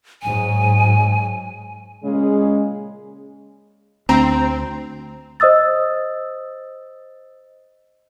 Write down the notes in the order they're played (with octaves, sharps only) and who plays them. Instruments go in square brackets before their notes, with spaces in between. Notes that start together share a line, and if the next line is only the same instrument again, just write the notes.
[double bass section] G#2 F#3 [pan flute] G#5
[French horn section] A#2 C#3 G#3
[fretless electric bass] D2 [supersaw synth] C4 [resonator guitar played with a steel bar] A#5
[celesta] C5 D#5 D#6 E6 A6